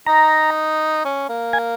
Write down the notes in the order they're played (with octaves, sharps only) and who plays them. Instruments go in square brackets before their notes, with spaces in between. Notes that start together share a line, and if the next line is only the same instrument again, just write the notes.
[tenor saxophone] D#4 [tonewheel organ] A#5
[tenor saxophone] C#4
A#3
[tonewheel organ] G#5